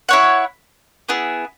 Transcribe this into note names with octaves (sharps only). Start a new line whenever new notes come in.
E4 C#5 F#5
B3 E4 G#4